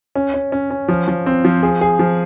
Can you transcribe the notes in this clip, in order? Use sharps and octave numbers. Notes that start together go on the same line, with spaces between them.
C#4
C#4
C#4
C#4
F3
F3
C4
F3
G#4
G#4
F3